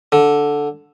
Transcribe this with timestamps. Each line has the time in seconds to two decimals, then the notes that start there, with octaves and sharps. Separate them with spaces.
0.12 D3